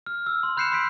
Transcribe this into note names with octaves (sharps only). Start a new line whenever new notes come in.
F6
E6
C6
B5 F#6 G6 C7 C#7 E7
C6 E6 G6 B6 D7